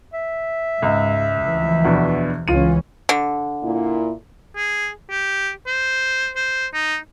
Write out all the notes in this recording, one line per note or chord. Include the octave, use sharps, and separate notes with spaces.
E5
C#2 G#2
D2 E3 F3
E2 B2 D4
C#2 E3 C#4 F4 D#7
D3
A#2 E4
G#4
G4
C5
C5
D#4